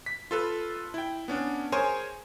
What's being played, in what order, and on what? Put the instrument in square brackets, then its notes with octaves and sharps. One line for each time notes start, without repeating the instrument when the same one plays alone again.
[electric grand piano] B6
F4 A4 B4
E4 G5
B3 C#4 D4
G#4 A#4 C5 C#5 G#5